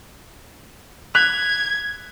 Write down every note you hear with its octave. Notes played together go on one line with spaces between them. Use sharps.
F#6 G#6 B6 F7